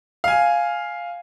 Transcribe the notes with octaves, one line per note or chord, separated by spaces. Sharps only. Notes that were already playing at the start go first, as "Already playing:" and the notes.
F5 G#5